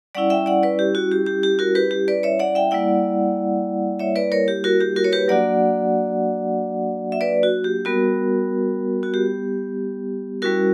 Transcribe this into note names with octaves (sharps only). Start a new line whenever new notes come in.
G3 C#4 E4 D5 F#5
E5 G5
D5 F#5
B4 D5
G4
F#4
G4
G4
G4
F#4 A#4
G4 B4
G4
B4 D5
C#5 E5
D5 F#5
E5 G5
G3 A#3 E4 D5 F#5
C#5 E5
B4 D5
A#4 C#5
G4
F#4 A#4
G4
F#4 A#4
C#5
G4 B4
F#3 A#3 D4 F#4 D5 F#5
E5
B4 D5
F#4
G4
G3 B3 F#4 A#4
F#4
G4
G3 C#4 E4 F#4 A#4